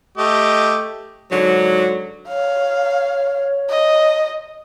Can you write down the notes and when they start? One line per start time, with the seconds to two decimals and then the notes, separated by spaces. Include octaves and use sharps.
0.18 A3 G4 D#5
1.31 G#2 D3 F#3
2.28 C#5 F5
3.69 D#5